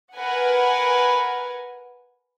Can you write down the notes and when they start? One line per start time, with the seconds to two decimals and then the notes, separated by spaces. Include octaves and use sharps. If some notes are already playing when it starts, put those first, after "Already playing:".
0.15 A#4 B4 F#5 G#5